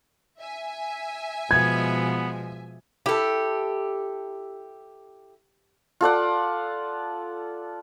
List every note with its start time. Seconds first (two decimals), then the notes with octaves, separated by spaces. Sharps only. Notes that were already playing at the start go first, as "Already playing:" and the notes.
0.39 E5 G#5
1.51 B2 F3 G#3 B3 G#6
3.06 E4 G4 A4
6.01 F4 A4 D5 F#5